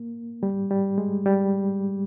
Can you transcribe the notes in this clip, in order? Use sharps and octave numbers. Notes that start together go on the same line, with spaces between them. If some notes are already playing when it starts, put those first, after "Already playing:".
Already playing: A#3
G3
G3
G#3
G3